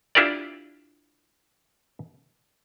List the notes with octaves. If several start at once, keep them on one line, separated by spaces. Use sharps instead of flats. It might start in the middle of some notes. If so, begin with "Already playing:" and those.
D4 E4 F4 G4 A#4 D5